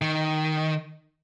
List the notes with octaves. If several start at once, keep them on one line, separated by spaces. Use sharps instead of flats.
D#3